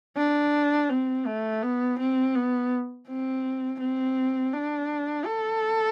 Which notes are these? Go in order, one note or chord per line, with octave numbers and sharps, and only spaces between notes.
D4
C4
A3
B3
C4
B3
C4
C4
D4
A4